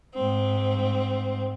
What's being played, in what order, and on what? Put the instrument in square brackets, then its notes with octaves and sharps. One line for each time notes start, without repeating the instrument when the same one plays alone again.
[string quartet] G#2 C4